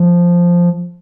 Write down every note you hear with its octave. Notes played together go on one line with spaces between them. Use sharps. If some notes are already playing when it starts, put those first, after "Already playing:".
Already playing: F3